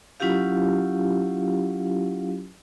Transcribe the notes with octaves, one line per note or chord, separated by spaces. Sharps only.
F#3 C#4 E4 F4 G4 F5